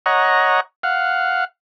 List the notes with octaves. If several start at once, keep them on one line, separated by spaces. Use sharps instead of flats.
C#5 D#5 F#5 A#5
F5 F#5